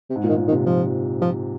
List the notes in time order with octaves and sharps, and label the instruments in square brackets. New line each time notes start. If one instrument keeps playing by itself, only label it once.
[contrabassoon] C3
[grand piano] G#2
A#2
[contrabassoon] D#3
[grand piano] A#2
[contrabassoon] D#3
[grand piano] C3
[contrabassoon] F3
F3